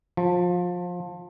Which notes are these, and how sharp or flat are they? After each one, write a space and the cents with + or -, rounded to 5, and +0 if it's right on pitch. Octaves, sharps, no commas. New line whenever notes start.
F3 +25